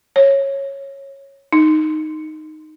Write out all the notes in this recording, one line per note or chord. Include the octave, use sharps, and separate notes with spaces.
C#5
D#4